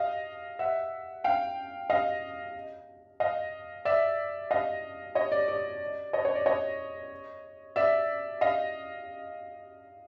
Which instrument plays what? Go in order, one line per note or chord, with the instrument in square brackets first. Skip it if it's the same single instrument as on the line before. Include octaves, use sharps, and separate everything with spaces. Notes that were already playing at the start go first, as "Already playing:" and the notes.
Already playing: [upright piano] D#5 F5
E5 F#5
F5 G5
D#5 F5
D#5 F5
D5 E5
D#5 F5
C#5 D#5
D5
D5
C#5 D#5
C#5
D5
C#5 D#5
D5 E5
D#5 F5